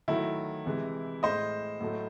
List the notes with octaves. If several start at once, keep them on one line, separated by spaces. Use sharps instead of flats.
D#3 F#3 A3 E4
C3 E3 G#3
A2 G#3 C5 D#5
A2 F#3 A3